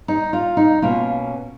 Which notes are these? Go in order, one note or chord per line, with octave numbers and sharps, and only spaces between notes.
D#4
F4
D#4
B2 A#3 C#4 F4